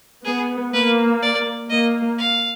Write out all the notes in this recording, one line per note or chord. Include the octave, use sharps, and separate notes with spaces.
B3 G#4
A#3 B4
D5
A#3 D#5
F5